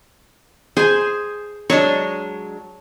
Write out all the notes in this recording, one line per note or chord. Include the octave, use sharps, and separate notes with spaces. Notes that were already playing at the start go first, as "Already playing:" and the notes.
G#4 C5 G#5
F#3 G#3 D4 C#5